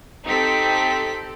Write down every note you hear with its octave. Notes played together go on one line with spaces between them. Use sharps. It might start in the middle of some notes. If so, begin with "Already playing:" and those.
C4 D#4 G4 A4 B6